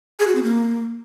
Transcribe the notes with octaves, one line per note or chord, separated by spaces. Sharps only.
G#4
F#4
C4
A#3